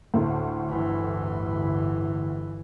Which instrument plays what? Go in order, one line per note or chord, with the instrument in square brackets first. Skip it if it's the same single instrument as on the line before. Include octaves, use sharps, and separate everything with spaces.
[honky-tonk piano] D2 A2
[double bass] G1 E3